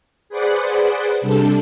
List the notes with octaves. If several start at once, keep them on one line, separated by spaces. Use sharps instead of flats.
G#4 B4 C5 D5 F#5 D6
C3 G3 D4 A4